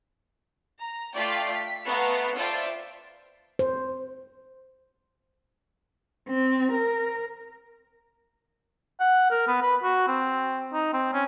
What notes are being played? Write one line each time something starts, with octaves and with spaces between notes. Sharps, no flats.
A#5
A3 F4 D5 F5 G5 B6
B6
A3 B3 F5 A#5
F4 A4 C5 D5 E5 G5
C5
C4
A#4
F#5
A#4
B3
B4
F#4
C4
D#4
C4
C#4